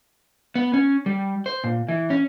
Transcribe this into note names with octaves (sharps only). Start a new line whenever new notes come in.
B3
C#4
G3
C5
A#2
E3
C#4